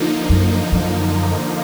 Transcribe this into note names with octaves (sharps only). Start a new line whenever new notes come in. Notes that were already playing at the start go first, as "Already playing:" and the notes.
Already playing: D3 F3 A#3 D#4
F#2
F#2